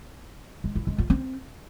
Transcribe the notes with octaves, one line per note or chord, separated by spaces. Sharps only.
G#3
E4
G#3
F4
C4